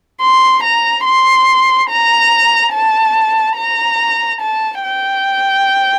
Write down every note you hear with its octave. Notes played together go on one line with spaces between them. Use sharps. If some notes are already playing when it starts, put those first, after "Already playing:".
C6
A#5
C6
A#5
A5
A#5
A5
G5